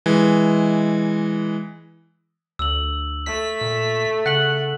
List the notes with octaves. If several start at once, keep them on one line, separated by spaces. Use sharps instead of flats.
E3 G#3
D2 E6 F#7
A3 B6
A#2
C#3 F#5 F#6 B6 F#7